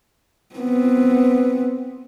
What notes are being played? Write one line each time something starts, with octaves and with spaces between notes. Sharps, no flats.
B3 C4